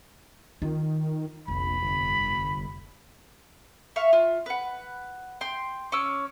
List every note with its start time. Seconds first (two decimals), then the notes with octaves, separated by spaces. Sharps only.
0.62 D#3 F4
1.48 F1 A#1 B5
1.81 G1
3.96 E5 F5 C#6
4.13 F4
4.46 B4 F#5
5.41 G5 C6
5.92 C#4 D6 E6